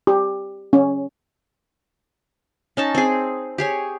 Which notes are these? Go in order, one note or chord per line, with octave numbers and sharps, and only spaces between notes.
G4
C#4
C#4 D#4 A5
C4 G#4
G4 G#4 C#5